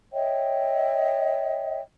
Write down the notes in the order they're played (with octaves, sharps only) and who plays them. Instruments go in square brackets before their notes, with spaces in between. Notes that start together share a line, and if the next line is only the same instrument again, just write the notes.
[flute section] C#5 D#5 E5 G5